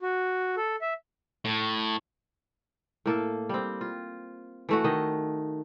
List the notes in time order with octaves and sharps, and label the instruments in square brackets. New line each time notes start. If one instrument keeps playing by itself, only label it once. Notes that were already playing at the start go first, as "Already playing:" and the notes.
[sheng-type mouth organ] F#4
A4
E5
[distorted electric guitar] A2
[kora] A2 A#3 A4
G3 C4
F4
E3 A3 F#4
D#3 D#5